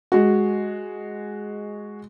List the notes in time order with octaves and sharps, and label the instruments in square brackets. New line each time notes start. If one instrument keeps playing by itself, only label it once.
[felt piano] G#3 F#4